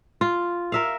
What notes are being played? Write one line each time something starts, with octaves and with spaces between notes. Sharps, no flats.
F4
A#4 E5 F5